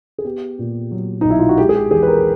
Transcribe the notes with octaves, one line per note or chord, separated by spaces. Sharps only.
G#4
B3 G4
A#2
F#3
B1 D#4
E4
F4
F#4
G#3 G4
G#4
G4
E2 G#4
B4
A#4